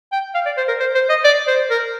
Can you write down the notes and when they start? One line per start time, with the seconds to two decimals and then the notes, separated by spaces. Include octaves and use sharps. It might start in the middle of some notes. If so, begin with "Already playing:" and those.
0.12 G5
0.35 F5
0.46 D5
0.58 C5
0.68 A#4
0.80 C5
0.95 C5
1.10 D#5
1.24 D5
1.48 C5
1.71 A#4